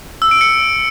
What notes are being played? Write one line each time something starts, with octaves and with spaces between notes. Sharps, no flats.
E6
D7
C#7